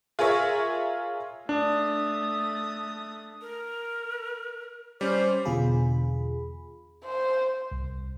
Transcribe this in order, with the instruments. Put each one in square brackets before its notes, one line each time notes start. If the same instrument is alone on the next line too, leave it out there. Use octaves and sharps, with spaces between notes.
[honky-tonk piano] F4 G#4 A#4 C#5 E5
[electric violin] A3 D#6 [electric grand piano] D4
[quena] A#4
[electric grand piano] G3 C#4 [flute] C5 [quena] D6
[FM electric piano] E2 B2 D3 F4 G#4 B5
[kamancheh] C5
[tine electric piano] C2